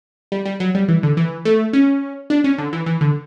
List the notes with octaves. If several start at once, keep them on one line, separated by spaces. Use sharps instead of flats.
G3
G3
F#3
G3
E3
D3
E3
A3
C#4
D4
C#4
D3
E3
E3
D3